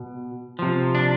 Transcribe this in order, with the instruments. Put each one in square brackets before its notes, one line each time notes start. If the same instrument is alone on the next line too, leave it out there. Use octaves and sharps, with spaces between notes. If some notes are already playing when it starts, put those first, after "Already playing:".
Already playing: [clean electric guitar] B2
C3 F3
D4